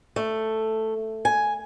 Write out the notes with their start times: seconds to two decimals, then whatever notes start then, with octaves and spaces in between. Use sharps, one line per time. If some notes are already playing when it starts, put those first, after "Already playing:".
0.16 A3
1.25 G#5